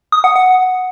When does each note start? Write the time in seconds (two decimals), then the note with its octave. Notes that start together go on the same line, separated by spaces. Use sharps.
0.12 D#6
0.24 F#5
0.36 F#5